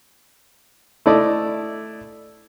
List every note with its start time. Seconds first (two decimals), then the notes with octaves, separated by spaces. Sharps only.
1.06 A3 E4 D5 D#5